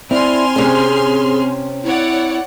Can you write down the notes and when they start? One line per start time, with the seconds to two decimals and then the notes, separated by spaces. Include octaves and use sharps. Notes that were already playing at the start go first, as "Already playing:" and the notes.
0.11 C4 E4 D5 G#5 C6 F6
0.56 C3 C#4 G#4
1.84 E4 C#5 D5 F#5